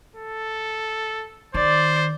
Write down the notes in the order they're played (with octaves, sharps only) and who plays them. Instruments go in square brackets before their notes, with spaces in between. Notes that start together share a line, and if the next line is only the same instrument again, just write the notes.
[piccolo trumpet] A4
[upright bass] D#3 [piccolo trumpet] C5 [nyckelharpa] D5